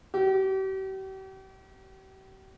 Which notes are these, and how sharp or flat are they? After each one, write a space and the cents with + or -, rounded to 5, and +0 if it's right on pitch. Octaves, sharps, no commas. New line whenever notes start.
G4 -40